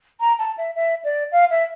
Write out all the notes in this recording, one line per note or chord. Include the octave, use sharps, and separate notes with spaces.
A#5
A5
E5
E5
D5
F5
E5